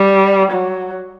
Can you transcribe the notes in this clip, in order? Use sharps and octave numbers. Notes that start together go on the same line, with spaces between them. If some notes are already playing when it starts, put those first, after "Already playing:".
Already playing: G3
F#3